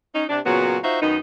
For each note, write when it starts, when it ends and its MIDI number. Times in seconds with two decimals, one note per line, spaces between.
0.14 0.23 61
0.14 0.23 63
0.29 0.39 48
0.29 0.39 62
0.44 0.77 46
0.44 0.77 49
0.44 0.77 54
0.44 0.77 59
0.44 0.77 66
0.83 1.00 63
0.83 1.00 65
0.83 1.00 66
0.83 1.00 72
0.83 1.00 76
1.01 1.16 42
1.01 1.16 51
1.01 1.16 59
1.01 1.16 63